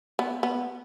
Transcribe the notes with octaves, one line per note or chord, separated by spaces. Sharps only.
B3
B3